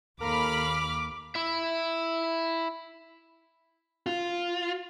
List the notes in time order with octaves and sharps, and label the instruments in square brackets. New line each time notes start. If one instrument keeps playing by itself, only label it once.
[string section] D#2 B5 F6 [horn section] A4 A#4 F5 [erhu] D6
[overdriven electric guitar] E4 E5
[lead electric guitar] F4